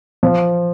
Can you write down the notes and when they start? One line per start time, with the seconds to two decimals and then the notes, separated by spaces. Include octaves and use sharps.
0.23 F3